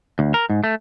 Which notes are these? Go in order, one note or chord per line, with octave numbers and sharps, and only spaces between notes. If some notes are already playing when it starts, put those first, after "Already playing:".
D2
A#4
G#2
A3